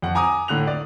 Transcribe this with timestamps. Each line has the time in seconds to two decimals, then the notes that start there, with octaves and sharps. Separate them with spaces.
0.02 F2 F#5
0.15 G#5 A#5 D6 D#6
0.48 A2 D3 F#6 F7
0.67 D5